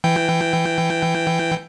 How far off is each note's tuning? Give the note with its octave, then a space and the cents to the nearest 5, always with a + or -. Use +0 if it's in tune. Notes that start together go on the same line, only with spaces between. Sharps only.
E3 +15 G5 +0